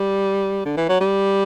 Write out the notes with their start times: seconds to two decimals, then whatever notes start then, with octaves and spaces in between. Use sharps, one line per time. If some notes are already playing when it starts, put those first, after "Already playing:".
Already playing: G3
0.65 D3
0.77 E3
0.89 F#3
1.00 G3